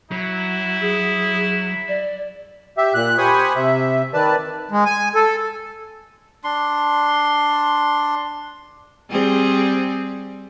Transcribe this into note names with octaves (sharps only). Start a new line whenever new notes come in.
F#3 E4
G#4
D5
G4 E5
A#2 F#6
G4 C5 G#5 B5 C#6 D#6
C3 E5
D#3 B4 D5 A5
G#3
G#5
A4
D4 C6
G3 C4 G#4